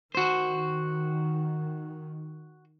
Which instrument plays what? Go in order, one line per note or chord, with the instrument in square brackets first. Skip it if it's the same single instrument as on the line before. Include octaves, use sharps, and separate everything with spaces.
[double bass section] D#3 [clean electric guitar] F#4 C5